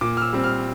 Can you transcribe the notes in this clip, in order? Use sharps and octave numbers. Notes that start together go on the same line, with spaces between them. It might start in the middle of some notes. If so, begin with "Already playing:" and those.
A#2 D6
F6
E6
G3 C4
F6